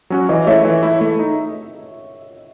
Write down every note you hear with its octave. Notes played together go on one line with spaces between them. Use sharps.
F#3 C#4 F#4
E3 D#5
A3 E4 C#5 E5
E3
A3 E4
A3
D#4